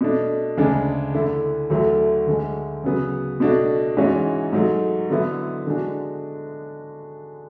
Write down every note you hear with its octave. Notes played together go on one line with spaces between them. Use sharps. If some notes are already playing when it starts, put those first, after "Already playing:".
B2 A3 D4
D2 C#3 G#3 D4
D3 A3 E4
D2 D3 F#3 A3
D2 D3 G#3
C#3 F#3 B3
B2 A3 D4 F#4
G#2 E3 G#3 C#4 F#4
G#2 F#3 A3
D3 F#3 B3 E4
D3 G#3 D4 F#4